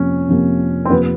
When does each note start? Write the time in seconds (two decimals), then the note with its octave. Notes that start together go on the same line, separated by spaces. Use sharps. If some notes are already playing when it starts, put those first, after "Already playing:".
Already playing: F2 C3 F3 A#3 C#4
0.29 F2 C3 F3 A#3
0.85 C4
0.90 F2 C3 F3 A#3 B3